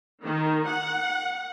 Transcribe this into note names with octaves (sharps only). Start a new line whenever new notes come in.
D#3
F#5